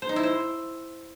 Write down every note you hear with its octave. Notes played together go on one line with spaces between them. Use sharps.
C5
D#4
E4
C5